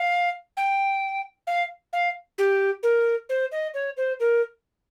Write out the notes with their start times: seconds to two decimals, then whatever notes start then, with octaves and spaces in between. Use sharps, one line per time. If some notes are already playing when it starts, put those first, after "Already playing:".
Already playing: F5
0.57 G5
1.47 F5
1.93 F5
2.38 G4
2.83 A#4
3.29 C5
3.52 D#5
3.74 C#5
3.97 C5
4.20 A#4